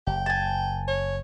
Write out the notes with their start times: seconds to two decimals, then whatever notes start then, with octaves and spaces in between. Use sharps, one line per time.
0.07 F#1 G5
0.26 G#5 A5
0.87 C#5